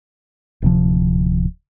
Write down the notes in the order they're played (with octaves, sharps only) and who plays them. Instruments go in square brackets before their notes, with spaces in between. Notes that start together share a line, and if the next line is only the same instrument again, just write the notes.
[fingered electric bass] D1 C3 F3